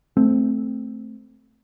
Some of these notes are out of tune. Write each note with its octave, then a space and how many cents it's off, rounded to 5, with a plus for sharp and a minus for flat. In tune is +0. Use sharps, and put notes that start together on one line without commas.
A3 -5 C4 +0